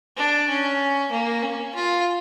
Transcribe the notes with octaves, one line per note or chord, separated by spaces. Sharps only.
D4
C#4
A#3
C#4
F4